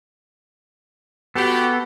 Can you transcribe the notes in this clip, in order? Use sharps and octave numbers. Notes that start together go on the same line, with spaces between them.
B3 F#4 G4 A4